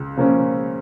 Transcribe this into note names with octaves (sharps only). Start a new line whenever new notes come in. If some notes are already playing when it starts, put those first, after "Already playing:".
Already playing: C#2
C#3 F3 A#3 C#4